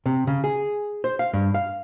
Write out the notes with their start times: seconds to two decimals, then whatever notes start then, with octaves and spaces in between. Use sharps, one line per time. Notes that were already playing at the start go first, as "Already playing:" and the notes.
0.06 C3
0.27 C#3
0.44 G#4
1.04 C5
1.19 F5
1.33 G2
1.54 F5